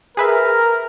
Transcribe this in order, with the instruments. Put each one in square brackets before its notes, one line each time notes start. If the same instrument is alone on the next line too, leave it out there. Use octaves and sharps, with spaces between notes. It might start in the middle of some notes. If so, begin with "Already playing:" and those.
[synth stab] G#4 B4 E5 [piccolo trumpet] A#4